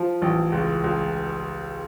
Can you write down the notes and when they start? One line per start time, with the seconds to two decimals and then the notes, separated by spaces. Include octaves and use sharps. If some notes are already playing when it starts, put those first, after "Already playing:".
Already playing: F3
0.22 A1
0.52 C#2
0.84 C#2